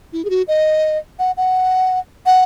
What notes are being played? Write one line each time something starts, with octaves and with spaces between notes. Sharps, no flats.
E4
G#4
F#4
D#5
F#5
F#5
F#5